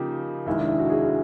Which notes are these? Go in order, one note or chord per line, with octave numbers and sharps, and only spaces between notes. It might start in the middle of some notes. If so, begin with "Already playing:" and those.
Already playing: C#3 F3 A#3 D#4 G4
F1 D#2 D#3 G#3 E4
D4
E4
F#4
G#4